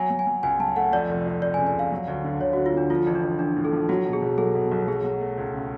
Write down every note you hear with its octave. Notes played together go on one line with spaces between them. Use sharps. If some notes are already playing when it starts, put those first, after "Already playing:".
Already playing: F#3 G#5
F#3
G#5
F#3
C#2 G#5
F#3 A5
A3 F#5
F2 D5
F1
F2
F1 D5
G#5
C#3
G#5
F1 F5
F#3
D2
D3
D2 C#5
D3 F#4
F4
D3 D4
F3 F4
A1
D4
A1
A1 D4
A2
A4
F3
F#3 F#4
B2
G#4
B1
F#3 A4
B2
B1
F#3 G#4
F#3
A3
C#2
C#3